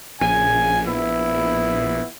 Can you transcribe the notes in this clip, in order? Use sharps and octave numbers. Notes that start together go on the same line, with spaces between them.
A#1 C#3 G#5
B3 E4